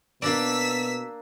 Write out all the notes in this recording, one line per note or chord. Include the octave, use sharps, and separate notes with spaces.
B2 A#3 D4 D5 E6 B6